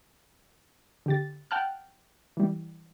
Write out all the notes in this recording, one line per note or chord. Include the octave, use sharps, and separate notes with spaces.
D3 G4 A6
F#5 G5 A5 F6 F#6
E3 G3